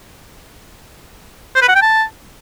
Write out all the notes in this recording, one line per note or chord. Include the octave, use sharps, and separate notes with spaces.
C5
B4
F#5
G5
A5